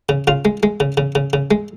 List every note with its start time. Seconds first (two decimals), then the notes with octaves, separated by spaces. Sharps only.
0.09 C#3
0.27 C#3 F4
0.45 G#3
0.63 G#3
0.80 C#3
0.97 C#3
1.15 C#3
1.33 C#3
1.51 G#3